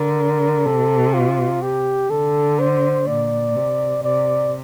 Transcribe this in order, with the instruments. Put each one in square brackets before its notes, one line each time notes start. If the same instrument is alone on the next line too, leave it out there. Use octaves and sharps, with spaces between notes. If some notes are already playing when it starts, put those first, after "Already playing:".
Already playing: [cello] D3 [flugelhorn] A#4
[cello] C3 [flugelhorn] A4
[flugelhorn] F4
G4
[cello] D3 [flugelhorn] A4
[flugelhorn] C5
[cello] A#2 [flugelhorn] D5
[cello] C3
[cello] C3 [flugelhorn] D5